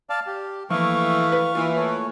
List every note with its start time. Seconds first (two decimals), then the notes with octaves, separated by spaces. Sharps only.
0.10 D5 F5 A5
0.27 G4
0.70 E3 F3 A3 A#3 F5 C#6
1.32 B4 B5
1.55 E3 A#3 F4
1.76 A3 C#5